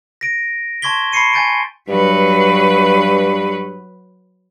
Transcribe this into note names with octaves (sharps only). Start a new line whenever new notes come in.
A#6 D7
A5 C6 C#6 G#6 B6 G7
A5 B5 C#6 C7 C#7 D#7
G#5 G6 A6 D7
G2 F#3 B4